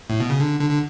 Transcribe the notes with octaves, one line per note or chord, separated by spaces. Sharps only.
A2
B2
C#3
D3
D3
D3